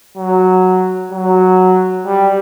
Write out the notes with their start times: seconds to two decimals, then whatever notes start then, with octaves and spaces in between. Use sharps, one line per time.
0.17 F#3
1.12 F#3
2.07 G3